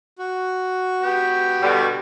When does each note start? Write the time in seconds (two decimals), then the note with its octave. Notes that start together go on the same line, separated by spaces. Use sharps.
0.19 F#4
1.03 B3 G4
1.62 B2 D3 G3